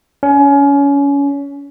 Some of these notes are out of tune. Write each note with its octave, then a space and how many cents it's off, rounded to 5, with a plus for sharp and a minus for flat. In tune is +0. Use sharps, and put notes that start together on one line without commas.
C#4 +25